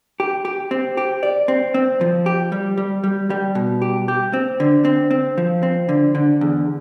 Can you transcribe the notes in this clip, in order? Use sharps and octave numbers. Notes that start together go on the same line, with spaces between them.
G4
G4
C4
G4
D5
C4
C4
F3
G4
G3
G3
G3
G3
B2
G4
G4
C4
D3
C4
C4
F3
C4
D3
D3
E2